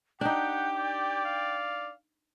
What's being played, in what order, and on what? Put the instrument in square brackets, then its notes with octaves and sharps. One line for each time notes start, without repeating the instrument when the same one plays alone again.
[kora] D4 D#4 [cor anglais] G4 [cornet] F#5 [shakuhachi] G5
[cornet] D5
[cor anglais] F5